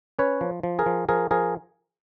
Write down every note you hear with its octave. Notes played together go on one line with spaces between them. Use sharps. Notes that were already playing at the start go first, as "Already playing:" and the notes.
C#4 B4 C#5
F3
F3
G#4 A#4
F3
F3 G#4 A#4
F3 G#4 A#4